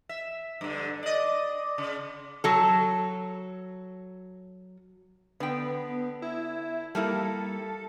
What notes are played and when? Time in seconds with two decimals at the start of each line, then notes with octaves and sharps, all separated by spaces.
0.09 E5
0.61 G2 D3
1.03 D5 D#5
1.78 C#3
2.44 F#3 A4
5.40 D3 B3 G5
6.22 E4
6.95 G3 A#3 E4 A4